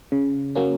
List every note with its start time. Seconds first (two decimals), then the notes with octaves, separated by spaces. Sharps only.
0.12 C#3
0.55 F#3 A#3 C#4